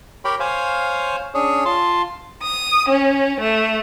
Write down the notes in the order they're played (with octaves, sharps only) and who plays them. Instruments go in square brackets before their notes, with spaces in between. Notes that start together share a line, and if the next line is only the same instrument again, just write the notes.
[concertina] G4 A#4 C#5 G5 B5
C5 C#5 F5 G#5
C#4 D4 G#4 C#5
F4 A5 C6
[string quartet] D#6
C#4
A3